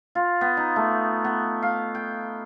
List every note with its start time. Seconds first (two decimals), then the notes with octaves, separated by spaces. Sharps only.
0.15 F4
0.41 B3
0.57 D#4
0.76 A3
1.24 B3
1.62 F5
1.95 G5